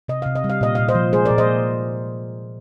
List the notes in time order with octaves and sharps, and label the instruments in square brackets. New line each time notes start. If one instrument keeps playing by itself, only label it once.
[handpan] C3 D#5
C3 F5
D#5
G3
F5
A#2 D#5
A#2 F5
C5 D#5
F3
G#3 G#4 C5
A#4 D5
A#2
C5 D#5